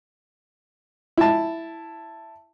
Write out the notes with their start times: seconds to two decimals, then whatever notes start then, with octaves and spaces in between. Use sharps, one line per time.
1.17 E4 A5